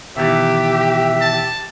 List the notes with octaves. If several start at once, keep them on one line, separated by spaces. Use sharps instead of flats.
B2 D#3 E3 G4 E5
A5